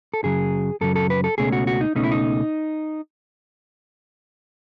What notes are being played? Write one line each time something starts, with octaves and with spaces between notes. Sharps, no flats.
A4
F#2 C#3 F#3 G#4
F#2 C#3 F#3 A4
A4
B4
A4
C#2 B2 A3 C#4 G#4
F#4
F#4
D#4
C#2 B2 A3 C#4 D#4
E4
D#4